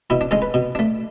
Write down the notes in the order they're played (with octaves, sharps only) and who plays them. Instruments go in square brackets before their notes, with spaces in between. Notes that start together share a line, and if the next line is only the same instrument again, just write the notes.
[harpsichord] B2 E4
D4
G#3 C#4 A4
B4
B2
A3 D4